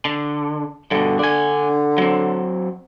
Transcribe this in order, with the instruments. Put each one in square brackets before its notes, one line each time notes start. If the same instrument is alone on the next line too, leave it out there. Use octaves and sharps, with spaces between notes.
[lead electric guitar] D3
[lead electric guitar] G2 B2 [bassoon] D3
[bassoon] D3 [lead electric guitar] D4 G#5
[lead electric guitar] F#3 C4